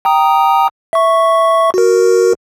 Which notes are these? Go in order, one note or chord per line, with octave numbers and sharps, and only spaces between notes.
G5 A#5 D#6
E5 C#6
F#4 A#4